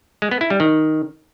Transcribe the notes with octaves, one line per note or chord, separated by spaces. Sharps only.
G#3
B3
E4
G3
D#3